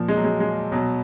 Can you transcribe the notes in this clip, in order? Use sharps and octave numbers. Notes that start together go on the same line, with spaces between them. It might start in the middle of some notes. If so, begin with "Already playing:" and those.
Already playing: A#2 F3
G#3
F#3
G#3
G#3
B2 F#3